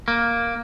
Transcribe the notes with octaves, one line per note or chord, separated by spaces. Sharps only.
A#3